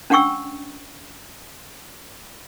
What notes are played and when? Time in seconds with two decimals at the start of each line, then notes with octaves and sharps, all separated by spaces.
0.10 C#4 D4 F#5 G5 C#6 E6